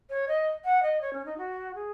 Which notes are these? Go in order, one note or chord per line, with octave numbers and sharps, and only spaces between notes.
C#5
D#5
F#5
D#5
C#5
C#4
D#4
F#4
G#4